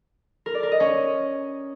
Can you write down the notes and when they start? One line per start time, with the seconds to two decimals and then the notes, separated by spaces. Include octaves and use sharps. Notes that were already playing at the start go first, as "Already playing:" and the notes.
0.46 A#4
0.54 D5
0.63 A#4
0.72 D#5
0.80 C#4